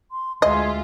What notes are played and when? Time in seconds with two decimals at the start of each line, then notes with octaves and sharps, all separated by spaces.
0.11 C6
0.42 D2 G#3 F4 D#5 E5 G#5 C6